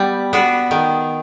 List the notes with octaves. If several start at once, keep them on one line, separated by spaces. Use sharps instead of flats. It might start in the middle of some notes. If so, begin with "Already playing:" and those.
Already playing: G3 B3
B3 D4 F#4
D#3